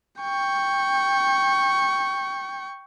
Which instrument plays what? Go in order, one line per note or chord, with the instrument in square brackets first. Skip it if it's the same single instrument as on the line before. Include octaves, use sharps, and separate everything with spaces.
[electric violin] G5 C#6